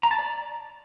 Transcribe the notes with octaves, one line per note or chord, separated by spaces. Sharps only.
A#5
A5
D5